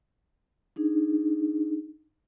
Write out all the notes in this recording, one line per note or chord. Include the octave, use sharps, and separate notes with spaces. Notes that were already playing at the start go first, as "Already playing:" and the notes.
D4 D#4 G#4